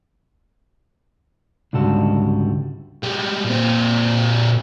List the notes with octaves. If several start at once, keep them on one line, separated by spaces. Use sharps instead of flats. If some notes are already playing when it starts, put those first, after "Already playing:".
C#2 G#2 D3 G3 F#4 A4
G3 G#3
A#2 C4